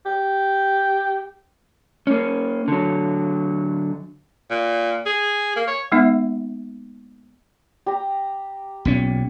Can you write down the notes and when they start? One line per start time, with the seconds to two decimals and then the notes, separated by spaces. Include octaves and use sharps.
0.06 G4
2.07 A#3 C#4
2.68 D3 F#3
4.50 A#2
5.06 G#4
5.56 A#3
5.67 C#5
5.92 G#3 A#3 B3 D#4 E5
7.86 G4 A#5
8.85 B1 A#2 C#4